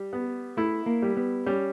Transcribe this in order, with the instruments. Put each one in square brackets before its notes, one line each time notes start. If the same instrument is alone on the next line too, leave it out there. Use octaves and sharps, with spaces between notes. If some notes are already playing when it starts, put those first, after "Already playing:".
Already playing: [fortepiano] G3
B3
[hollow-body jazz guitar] A3 [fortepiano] E4
[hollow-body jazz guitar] A#3
[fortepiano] G3
[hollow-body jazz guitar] B3
[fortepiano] G3 [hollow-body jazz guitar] C#4